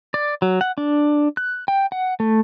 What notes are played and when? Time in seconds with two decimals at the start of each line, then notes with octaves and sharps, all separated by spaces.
0.14 D5
0.42 F#3
0.61 F#5
0.78 D4
1.37 F#6
1.68 G5
1.92 F#5
2.20 A3